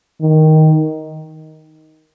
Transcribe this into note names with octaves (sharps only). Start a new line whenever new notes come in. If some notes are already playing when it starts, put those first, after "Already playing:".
D#3